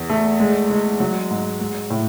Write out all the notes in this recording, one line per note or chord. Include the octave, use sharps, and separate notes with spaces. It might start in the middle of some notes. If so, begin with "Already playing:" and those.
Already playing: E2
A3
G#3
G#3
F#3
G#2
G#3
A2